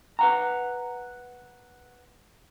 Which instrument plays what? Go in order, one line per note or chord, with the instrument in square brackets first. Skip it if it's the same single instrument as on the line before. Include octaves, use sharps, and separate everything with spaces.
[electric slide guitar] B4 F#5 A#5